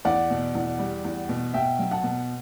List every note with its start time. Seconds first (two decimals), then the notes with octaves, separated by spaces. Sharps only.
0.05 E2 D5 F#5
0.30 B2
0.55 E2
0.79 G3
1.04 E2
1.29 B2
1.54 B2 E5 G5
1.79 F#3
1.91 F#5 A5
2.03 B2